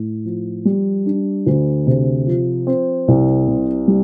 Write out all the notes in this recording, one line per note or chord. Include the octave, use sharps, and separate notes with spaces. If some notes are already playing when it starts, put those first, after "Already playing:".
Already playing: A2
F3
G3
D4
D2
C3
F3
C4
C2
C3
G3